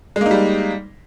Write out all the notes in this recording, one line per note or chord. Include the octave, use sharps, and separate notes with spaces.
G3 G#3 A#3 D#4